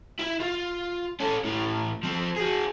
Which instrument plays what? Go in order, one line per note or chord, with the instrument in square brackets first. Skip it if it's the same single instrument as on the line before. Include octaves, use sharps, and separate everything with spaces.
[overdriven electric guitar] E4 E5
F4
C#4 A4
A2 E3
F3 C4
F#4 G#4